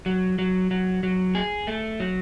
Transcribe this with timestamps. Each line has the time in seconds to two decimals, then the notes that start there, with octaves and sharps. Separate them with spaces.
0.06 F#3
0.39 F#3
0.71 F#3
1.03 F#3
1.35 G#4
1.67 A3
2.00 F#3